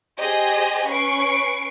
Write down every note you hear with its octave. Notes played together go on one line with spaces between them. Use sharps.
G4 G#4 C5 D#5
C#4 B4 C#6 C7 D7